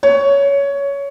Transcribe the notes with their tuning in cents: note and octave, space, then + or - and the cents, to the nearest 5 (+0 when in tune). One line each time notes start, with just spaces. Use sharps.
C#5 +15